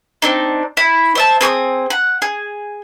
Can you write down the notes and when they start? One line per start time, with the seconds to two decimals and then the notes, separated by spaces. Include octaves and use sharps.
0.22 C4 D4 D#4
0.77 E4
1.15 C5 E5 A5
1.41 C4 G#4 C#6 D#6
1.90 F#5
2.22 G#4